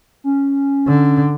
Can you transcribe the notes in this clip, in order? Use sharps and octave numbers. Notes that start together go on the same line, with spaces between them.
C#4
D3